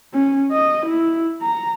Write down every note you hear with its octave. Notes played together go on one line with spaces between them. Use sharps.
C#4
D#5
E4
A#5